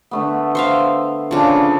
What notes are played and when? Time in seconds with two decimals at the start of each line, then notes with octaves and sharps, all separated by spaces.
0.11 D3 A3 B3
0.55 C5 E5 F5
1.31 C#3 F3 D4